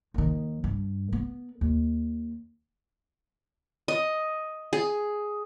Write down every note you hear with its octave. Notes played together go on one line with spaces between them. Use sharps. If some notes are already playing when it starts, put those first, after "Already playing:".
D#2 D#3
G2
B3
D#2
D#5
G#4